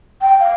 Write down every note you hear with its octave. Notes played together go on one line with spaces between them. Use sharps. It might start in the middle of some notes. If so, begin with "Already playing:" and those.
G5
F5